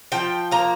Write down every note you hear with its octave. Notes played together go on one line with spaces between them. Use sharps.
F3 G5
A#3 A#5